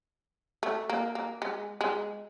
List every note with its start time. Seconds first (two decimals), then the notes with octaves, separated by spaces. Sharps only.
0.63 A3
0.90 A#3
1.15 A#3
1.42 G#3
1.81 G#3